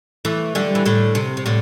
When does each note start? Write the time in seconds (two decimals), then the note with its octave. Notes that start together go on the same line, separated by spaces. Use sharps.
0.25 E3 A3
0.55 D3 G3
0.75 E3
0.86 A2 D3
1.15 C3
1.37 C3
1.46 A2 D3